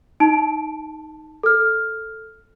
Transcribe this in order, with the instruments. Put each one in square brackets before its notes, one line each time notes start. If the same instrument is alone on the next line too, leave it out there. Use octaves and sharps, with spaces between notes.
[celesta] D#4 A5 D7
A4 F6